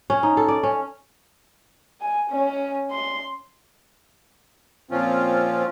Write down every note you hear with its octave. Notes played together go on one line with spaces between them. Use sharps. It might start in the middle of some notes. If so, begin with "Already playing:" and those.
C#4
D#4
A4
D5
C#4
G#5
C#4
C6
A#2 F3 C4 C#4 F4